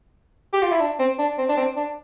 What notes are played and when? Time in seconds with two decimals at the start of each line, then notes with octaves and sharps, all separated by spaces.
0.53 G4
0.62 F4
0.72 E4
0.80 D4
0.99 C4
1.19 D4
1.38 C4
1.49 D4
1.57 C4
1.77 D4